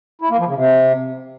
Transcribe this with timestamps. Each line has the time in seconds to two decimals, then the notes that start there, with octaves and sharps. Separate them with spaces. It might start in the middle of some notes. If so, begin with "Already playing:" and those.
0.22 E4
0.30 A#3
0.39 F3
0.47 C#3
0.56 C3